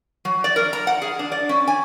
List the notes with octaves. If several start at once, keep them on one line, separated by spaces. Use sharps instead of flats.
F#3
D5
A#4
A#5
F#5
G#4
D4
D5
C#4
G#5